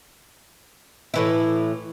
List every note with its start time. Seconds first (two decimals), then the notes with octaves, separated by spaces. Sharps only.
1.14 A2 E3 E4